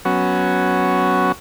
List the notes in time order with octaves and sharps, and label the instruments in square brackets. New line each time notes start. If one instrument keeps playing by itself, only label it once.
[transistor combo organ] F#3 B3 C#4 F#4